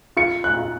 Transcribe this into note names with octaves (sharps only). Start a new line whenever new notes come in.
F4 C#7
F#6
F4